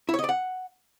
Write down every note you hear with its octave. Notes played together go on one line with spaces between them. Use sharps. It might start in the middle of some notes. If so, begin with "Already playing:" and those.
E4
C#5
D#5
D5
F#5